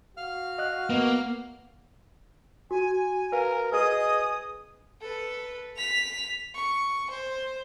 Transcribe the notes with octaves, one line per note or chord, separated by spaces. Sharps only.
F#4 F5 F6
D#5 F#6
A#3 B3
F#4 G#5
A#4 B4 F5
G#4 B4 D#5 D#6
A4 B4
B6 F7
C#6
C5